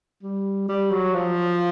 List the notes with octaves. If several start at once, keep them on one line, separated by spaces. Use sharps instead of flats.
G3
G3
F#3
F3